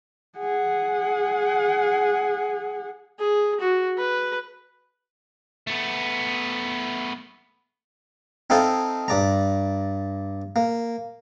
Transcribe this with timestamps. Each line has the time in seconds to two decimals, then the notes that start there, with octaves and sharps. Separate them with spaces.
0.37 G#4 F#5
3.19 G#4
3.61 F#4
3.98 B4
5.67 A3 B3
8.50 C4 D#4 E4 A4 F5 A5
9.08 G2 D5 A#5
10.56 A#3